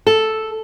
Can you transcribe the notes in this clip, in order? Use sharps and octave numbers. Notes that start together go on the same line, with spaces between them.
A4